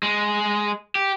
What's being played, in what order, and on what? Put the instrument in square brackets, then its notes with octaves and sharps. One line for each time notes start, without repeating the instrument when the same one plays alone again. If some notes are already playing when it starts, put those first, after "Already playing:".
[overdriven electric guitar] G#3
G4